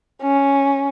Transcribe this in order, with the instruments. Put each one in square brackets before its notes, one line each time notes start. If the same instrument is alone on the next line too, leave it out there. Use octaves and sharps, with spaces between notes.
[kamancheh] C#4